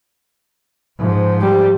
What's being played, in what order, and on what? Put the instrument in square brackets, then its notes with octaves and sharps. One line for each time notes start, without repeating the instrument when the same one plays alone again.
[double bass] G#2 F3
[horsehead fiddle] G3 G4